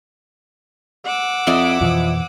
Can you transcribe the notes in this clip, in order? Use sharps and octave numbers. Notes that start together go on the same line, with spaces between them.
F#5 D6 E6
F2 E4 D5 D#5
F2 B2 E3 F3